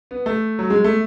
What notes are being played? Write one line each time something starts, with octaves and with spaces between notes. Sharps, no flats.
B3
A3
F#3
G#3
A3